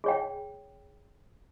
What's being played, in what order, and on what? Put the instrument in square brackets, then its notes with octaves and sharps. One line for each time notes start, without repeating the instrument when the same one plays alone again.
[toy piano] G#4 C#5 G5